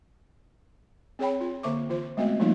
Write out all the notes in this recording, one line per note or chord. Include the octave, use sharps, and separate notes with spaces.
C4 G#4 C#5 G5 B5
F4
D3 A#3 C5 E5 C#6 D6
E3 F4 C5
G#3 A3 B3 C4 F#4 D#5
F3 G3 A3 A#3 D#4 F4